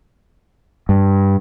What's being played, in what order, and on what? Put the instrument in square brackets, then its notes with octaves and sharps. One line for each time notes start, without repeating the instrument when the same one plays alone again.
[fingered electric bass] G2